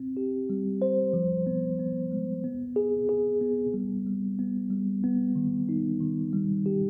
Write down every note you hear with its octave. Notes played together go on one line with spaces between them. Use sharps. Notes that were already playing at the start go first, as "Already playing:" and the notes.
Already playing: C4
G4
G3
C5
F3
B3
B3
G#3
B3
G#4
G#4
B3
G3
G3
B3
G3
B3
D#3
D#4
D#3
G3
G4